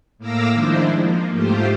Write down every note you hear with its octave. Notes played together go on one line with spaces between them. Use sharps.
A2 A#3 F5 D6 E6 A#6
D#3 F3 G#3 D4 E4 C5
F3 A#3
G#2 A3 F4 G4 C5